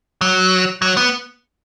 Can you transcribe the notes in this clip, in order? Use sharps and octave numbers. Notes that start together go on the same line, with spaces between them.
F#3
F#3
B3